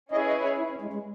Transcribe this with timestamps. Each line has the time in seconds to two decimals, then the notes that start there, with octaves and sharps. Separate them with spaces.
0.11 C#4 E4 G#4 B4 D#5
0.27 D#5
0.43 C#5
0.58 E4
0.70 C#4
0.82 G#3
0.93 G#3